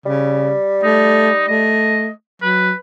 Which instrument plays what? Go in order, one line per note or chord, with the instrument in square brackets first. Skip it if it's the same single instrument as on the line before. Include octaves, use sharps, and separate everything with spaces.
[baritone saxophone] C#3 [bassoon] G3
[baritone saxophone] A3 [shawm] D#4
[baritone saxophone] A3 [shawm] D#5
[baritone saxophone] F#3 [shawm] B4